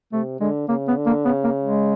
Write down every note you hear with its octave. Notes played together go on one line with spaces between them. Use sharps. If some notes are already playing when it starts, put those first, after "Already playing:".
C3 A3
D3 G#3
C#3 A#3
B3
D3
A#3
C#3 B3
A#3
G#3